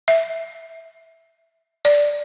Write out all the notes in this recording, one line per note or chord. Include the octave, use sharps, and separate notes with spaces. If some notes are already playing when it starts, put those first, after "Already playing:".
E5
D5